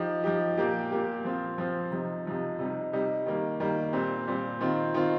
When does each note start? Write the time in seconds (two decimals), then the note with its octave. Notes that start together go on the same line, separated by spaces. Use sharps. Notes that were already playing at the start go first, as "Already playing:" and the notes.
Already playing: F3 D#4 G4
0.24 F3 D#4 G4
0.57 A#2 A#3 G4
0.91 A#2 A#3 G4
1.24 F3 C4 F4
1.58 F3 C4 F4
1.91 C3 F3 D#4
2.25 C3 F3 D#4
2.58 C3 G3 D#4
2.93 C3 G3 D#4
3.26 D#3 G3 A#3
3.60 D#3 G3 A#3
3.93 A#2 G3 C4
4.27 A#2 G3 C4
4.61 D#3 C4 F4
4.94 D#3 C4 F4